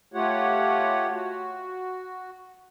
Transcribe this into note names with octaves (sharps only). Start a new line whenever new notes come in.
A3 F4 G4 C#5 F#5
F#4